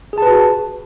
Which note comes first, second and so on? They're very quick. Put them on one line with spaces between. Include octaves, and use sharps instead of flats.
G#4 A5 B4 F#4